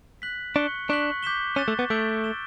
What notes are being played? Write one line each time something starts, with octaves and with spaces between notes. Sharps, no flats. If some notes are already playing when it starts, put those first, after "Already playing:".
F#6 B6 F#7
D4 C#6 F#6 C#7 G7
D4 C#6 F#6 B6 F#7
D6 G6 B6 E7 G7
C#4 F#6 A6 E7 G7
A3
B3
A3 E6 G6 D7 G7
F#6 A6 E7 G7